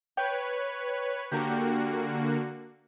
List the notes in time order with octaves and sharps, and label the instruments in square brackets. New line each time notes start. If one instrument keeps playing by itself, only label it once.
[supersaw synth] B4 C#5 [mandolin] G5
[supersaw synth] D3 A#3 F#4 [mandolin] G4 A#5